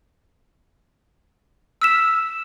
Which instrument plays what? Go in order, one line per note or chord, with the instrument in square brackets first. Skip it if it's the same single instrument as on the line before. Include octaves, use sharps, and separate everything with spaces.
[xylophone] E6 F6 B6 E7